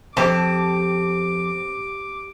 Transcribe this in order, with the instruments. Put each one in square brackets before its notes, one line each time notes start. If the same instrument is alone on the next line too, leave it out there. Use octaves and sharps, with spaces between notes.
[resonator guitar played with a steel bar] F2 [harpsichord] C4 [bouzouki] G4 A5 [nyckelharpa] D6